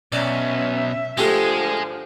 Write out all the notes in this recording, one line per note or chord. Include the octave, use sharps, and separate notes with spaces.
B1 C#4 D5 E5
D3 F3 G#3 A3 F4 G4